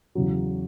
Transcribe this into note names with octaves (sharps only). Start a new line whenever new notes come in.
E2 C#3 F#3